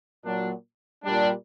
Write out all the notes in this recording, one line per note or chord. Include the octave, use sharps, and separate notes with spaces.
A#2 F#3 D4
A#2 G3 D4